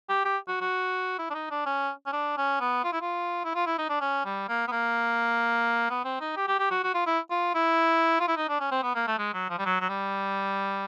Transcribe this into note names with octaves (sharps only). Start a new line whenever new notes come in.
G4
G4
F#4
F#4
E4
D4
D#4
D4
C#4
C#4
D4
C#4
B3
F4
E4
F4
E4
F4
E4
D#4
D4
C#4
G3
A#3
B3
A#3
B3
C4
D#4
G4
G4
G4
F#4
F#4
F4
E4
F4
E4
F4
E4
D#4
D4
C#4
C4
B3
A#3
A3
G#3
F#3
F3
G3
F#3
F#3
G3